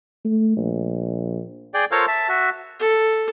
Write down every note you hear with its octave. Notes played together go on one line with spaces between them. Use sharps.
A3
A#1
G#4 D5 G5
F4 A4 A#4 C5 C#5 F5
E5 A5
F#4 E5
A4